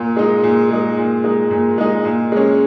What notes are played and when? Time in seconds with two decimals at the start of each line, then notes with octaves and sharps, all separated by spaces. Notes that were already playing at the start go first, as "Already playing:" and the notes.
Already playing: A#2
0.16 G#3 D#4
0.44 A#2
0.71 G#3 D#4
0.98 A#2
1.24 G#3 D#4
1.51 A#2
1.78 G#3 D#4
2.05 A#2
2.32 G#3 C#4